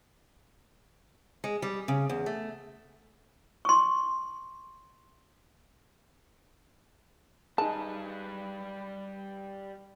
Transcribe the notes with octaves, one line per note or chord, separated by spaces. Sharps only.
G#3
G3
C#3
E2
A3
C6 C#6
G3 D#4 G#4 B4 A5